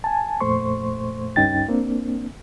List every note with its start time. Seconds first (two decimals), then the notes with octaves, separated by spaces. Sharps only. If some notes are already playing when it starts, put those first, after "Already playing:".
0.04 G#5 A5
0.40 F2 A#2 A3 C5 C6 C#6
1.36 C#2 G2 C#4 D#4 G5 A6
1.69 A#3 C4 D4